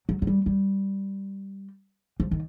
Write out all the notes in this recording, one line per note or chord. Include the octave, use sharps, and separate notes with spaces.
F#3
F#3
G3
G3
F3
D#3